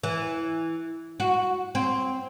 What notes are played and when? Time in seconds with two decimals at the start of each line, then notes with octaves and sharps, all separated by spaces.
0.03 E3
1.20 F#4
1.75 C4